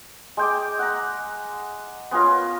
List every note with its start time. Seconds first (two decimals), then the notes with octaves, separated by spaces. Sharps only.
0.37 G#3 G5 D6
0.79 F#5 A#5
2.11 B3 C#4 F4 A#4